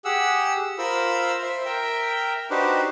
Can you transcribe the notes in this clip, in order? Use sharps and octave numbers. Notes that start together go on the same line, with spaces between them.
G4 G#4 F#5 E6
F4 A#4 C5 B5 E6
C5 E5
A#4 E5 G5
D4 D#4 F#4 G4 B4 C5